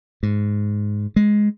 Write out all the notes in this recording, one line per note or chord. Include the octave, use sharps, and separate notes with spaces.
G#2
G#3